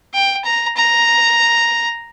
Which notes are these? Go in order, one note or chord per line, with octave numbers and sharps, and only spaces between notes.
G5
A#5
A#5